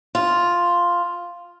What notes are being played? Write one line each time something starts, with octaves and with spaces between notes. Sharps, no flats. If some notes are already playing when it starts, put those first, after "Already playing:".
F4